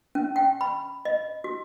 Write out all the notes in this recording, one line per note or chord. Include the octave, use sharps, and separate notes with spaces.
C#4
G5
B5
D#5
F#4